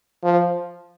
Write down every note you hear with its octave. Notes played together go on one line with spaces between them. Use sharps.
F3